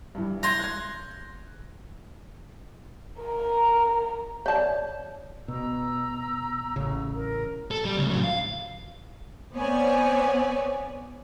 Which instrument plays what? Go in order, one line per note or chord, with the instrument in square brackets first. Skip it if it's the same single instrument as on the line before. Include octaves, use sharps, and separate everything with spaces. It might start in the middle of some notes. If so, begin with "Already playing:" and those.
[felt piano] G2 E3
[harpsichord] A#5 C6 [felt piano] G6 G#6
[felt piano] F#6 G#6
[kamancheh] A#4 A#5
[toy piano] C#5 D5 [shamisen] E5 A5
[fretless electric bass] B2 [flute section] A#5 E6
[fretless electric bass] A1 C#3
[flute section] A#4
[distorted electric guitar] A4
G3
D2 C#3
A2 F#3
F5
[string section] B3 C4 C#5 D5 G#5